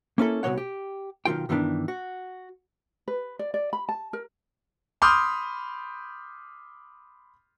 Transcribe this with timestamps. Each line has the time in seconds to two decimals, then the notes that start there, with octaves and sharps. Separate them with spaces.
0.18 A#3 C#4 E4 A4
0.43 C2 B2 F3 A#3 C#5 F#5
0.58 G4
1.25 B1 D#3 F3 F4 G5
1.49 G2 D#3 E3 B3 D4
1.88 F#4
3.08 B4
3.39 D5
3.54 D5
3.73 B5
3.89 A5
4.13 A#4
5.02 B5 C6 D6 D#6 F6 G6